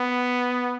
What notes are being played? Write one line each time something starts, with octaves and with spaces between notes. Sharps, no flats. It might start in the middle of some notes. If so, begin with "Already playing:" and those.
Already playing: B3